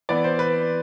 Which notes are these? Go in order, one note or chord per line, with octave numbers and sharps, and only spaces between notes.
E3 B3 D5
C5
B4